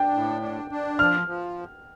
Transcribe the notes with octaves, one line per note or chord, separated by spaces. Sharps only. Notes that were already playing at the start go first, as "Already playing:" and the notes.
Already playing: D4 G5
A2
D4
D4
F3 F6
F3